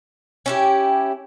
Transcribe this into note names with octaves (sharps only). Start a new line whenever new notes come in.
C#4 E4 G4